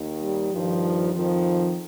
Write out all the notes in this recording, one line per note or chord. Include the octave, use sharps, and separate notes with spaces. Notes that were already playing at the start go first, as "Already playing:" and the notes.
Already playing: D#2 D#3
G3
G2 D#3 F3
F2 D#3 F3